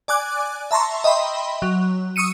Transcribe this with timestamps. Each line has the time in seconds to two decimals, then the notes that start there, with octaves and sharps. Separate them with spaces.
0.08 D5 G#5 D6 F#6
0.71 E5 A5 A#5 C6 C#6
1.04 D#5 E5 G5 B5 C6
1.62 F#3
2.16 C#6 D#6 E6 C#7 D#7